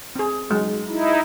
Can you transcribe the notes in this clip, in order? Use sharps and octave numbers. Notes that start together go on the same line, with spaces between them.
C4 G#4
F#3 G#3
D#4 E4